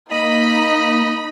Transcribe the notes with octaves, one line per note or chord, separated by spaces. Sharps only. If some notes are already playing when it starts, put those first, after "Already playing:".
A#3 D#4 D#5 B5